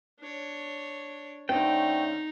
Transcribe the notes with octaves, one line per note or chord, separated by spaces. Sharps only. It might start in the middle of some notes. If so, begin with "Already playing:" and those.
D4 C#5
D3 A3 C4 C#4 D#4 G5